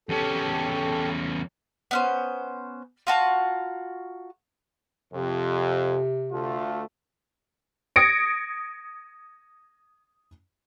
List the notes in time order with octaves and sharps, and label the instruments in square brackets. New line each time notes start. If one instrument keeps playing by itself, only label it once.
[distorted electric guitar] E2 C#4 [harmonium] G4 A4
[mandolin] B3 C#4 C5
F4 F#4 A5 A#5
[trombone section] F2 [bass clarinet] C3
[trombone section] D2 A3 F4
[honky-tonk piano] D#6 G#6 A#6 C#7 D7